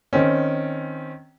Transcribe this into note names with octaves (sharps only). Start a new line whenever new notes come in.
D#3 C4 C#4